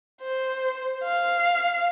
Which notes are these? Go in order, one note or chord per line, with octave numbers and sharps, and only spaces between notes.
C5
F5